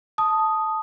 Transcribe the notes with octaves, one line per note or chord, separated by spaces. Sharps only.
A5 D#6